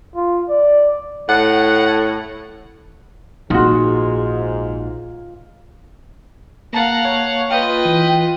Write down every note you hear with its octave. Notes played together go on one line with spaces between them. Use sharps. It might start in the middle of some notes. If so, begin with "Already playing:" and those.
F4
D5
A2 F#5
A#1 G#2 D#4 F4 F#4
A#3 F5 F#5 A5 A#5 A6
C#5
F4 B4 D#5 G5
E3